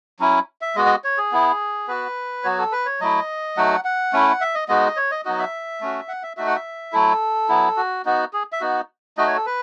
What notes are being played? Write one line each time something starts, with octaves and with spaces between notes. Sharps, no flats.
F#3 C#4 E4
E5
G#3 B3 F#4 D#5
D#5
C#5
G#4
B3 E4
B3 F#4 B4
F#3 B3 F#4 C#5
A4
B4
C#5
F#3 A3 E4 D#5
F#3 A3 D#4 F#4 F#5
F#5
A3 C#4 E4
E5
D#5
G#3 B3 D#4 F#4 D#5
C#5
D#5
F#3 B3 D#4 F#4 D#5
E5
A3 C#4 F#4
F#5
E5
A3 D#4 F#4 E5
F#5
E5
F#3 A3 E4 A4
F#3 B3 E4
F#4
B3 D#4 F#4
G#4
E5
B3 D#4 F#4
A3 D#4 F#4 D#5
C#5
A4
B4